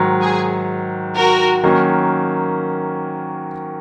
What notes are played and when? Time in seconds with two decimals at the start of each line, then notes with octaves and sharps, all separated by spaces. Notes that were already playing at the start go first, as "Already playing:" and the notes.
Already playing: G#2 D#3 F#3
0.22 G#4
1.16 F#4 A#4
1.63 D#3 F#3 A#3 C#4